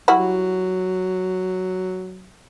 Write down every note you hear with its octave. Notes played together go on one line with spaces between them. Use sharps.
F#3 G3 E4 F#4